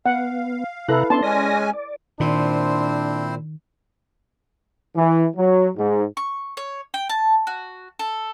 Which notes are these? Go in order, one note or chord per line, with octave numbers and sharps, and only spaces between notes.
B3 F5 F#5
C3 E4 A4 B4 A#5 F#6
B3 C#4 D4 A5 C6
G#3 C#4 D5 G#5 A#6
D5
A#2 D#3 C4 D4 E4 C5
E3
F#3
G#2
C#6
C#5
G5
A5
F#4
A4